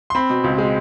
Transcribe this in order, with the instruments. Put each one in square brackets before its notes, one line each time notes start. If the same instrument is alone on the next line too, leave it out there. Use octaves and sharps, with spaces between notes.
[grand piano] C6
C4 B5
B2
C#2
G#3